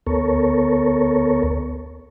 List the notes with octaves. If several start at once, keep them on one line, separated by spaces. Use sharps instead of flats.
D2 B3 A4 A#4 C#5